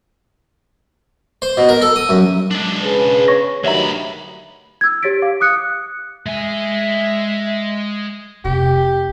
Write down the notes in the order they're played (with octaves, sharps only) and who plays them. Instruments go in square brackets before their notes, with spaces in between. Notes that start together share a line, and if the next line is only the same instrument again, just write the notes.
[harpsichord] C5
B2
A#4
A4
D#6
F#2
[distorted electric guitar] G#3 D4
[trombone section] C#3 G#4 B4
[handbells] C#5 C#6 A#6
[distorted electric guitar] D2 B5 [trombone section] G2 D#3 F#3 [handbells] C#5 E5 A#5
[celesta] E6 G#6
G4 C#5 A6 B6 D7
F5 D6
D6 D#6 F#6 C#7
[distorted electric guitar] G#3 G#5 [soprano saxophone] E5
[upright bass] F1 C3 [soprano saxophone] G4